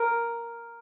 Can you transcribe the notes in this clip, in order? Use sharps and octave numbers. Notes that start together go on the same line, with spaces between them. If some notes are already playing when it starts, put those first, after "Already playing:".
Already playing: A#4